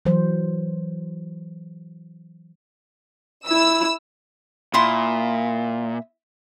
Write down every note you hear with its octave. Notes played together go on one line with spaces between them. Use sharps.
E3 F#3 C5
E4 E6
A#2 E4 C6 D#6